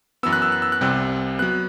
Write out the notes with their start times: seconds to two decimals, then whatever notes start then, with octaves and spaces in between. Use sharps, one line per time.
0.23 F#2 E3 B3 E6
0.33 F#6
0.42 E6
0.52 F#6
0.62 E6
0.72 F#6
0.81 C2 C3 G3 C4
1.39 F#3 B3 F#6